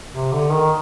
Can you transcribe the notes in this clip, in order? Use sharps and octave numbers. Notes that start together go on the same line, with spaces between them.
C3
D3
D#3